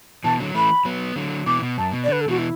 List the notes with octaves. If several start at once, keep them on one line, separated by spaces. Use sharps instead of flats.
B2 E3 A5
D3 F#3
E3 A3 B5
F#3 B3
D3 F#3
B2 E3 D6
B2
F#2 A5
B2
D5
D3 B4
A4
B2 E3 F#4
E4